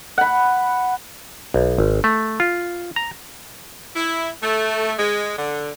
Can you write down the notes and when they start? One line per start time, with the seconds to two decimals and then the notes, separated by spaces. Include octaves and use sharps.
0.18 F#5 B5
1.54 B1
1.78 G#1
2.04 A3
2.40 F4
2.96 A#5
3.96 E4
4.43 A3
4.99 G#3
5.38 D3